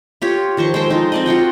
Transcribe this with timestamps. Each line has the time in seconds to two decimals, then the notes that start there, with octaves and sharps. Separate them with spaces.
0.22 F4 G4 C#5
0.57 D#3 F3 C5 C#6
0.74 G#3 A4 C5 G5
0.90 F3 D#4
1.12 C4 D5 D#5
1.26 F4 F#4 F#5 G5